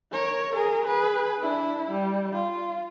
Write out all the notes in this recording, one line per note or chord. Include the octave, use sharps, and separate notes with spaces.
A#4 C#5
G#4 A#4
G#4 B4
D4 E4
G3
F4